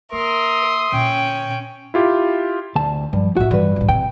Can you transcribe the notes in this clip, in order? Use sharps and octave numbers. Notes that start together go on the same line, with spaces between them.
A#3 A#4 E5 C6 D#6
A#2 D3 C#4 G5
E4 F4 G4
D2 A5
G2 F3
A2 C4 F#4 E5
G2 E3 G3 B4
A2 C3
C3 G5